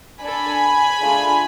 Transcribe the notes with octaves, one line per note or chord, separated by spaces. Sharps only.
D4 A4 G#5 B5
A3 D4 F4 G#4